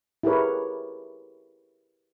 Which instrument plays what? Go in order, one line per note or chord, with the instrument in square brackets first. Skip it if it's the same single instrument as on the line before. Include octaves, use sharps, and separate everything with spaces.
[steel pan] E4 G4 G#4 A#4 B4 C#5